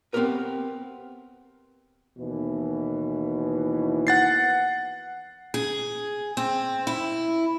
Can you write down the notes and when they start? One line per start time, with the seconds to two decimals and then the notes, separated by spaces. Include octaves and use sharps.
0.13 B3 C4 D#4 G4 A#4 B4
2.19 D#2 B2 E3
4.07 F#5 A6 C7
5.54 G#4
6.37 C4
6.87 E4